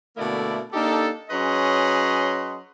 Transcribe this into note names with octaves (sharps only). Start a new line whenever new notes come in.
B2 D3 A3 A#3 E4 D5
A#3 D4 D#4 G4 A4
F#3 C#4 G#4 B4 D#5 C6